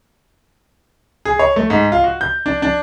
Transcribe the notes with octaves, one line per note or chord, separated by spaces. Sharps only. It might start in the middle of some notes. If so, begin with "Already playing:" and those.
G#4
C#5
A3
G#2
F4
F#4
G6
D4
D4